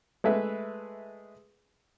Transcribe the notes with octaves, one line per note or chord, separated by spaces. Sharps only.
G#3 A3 G#4 B4 E5